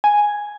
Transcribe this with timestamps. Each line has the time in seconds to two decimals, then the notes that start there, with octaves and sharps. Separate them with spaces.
0.04 G#5